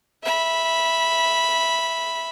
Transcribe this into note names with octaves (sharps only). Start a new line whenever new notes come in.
E5 B5